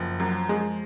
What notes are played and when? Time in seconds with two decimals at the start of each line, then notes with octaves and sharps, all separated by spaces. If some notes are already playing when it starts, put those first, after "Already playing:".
Already playing: F#1 F3
0.20 F#2
0.49 G#3